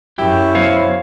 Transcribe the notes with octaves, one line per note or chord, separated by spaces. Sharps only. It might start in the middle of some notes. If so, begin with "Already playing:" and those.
F#2 E4 G4 G5
F#3 B3 C5 C#5 F5